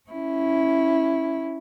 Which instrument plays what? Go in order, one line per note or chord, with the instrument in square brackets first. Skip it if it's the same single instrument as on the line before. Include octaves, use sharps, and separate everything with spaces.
[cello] C#4 E4